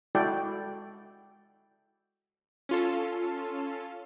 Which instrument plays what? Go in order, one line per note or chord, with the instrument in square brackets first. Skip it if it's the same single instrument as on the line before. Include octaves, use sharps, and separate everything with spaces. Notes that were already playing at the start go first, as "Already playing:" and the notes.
[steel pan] G#3 E4 F#4 A4 D5 G5
[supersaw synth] C#4 F4 A4